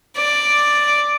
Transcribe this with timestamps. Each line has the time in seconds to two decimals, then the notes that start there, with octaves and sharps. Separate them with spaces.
0.17 D5